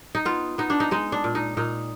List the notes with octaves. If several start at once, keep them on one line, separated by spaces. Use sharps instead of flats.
D#4
B3 F4
B3 D#4
D4
D#4
G#3 D#4
D4
A#2
D#4
A#2 D#4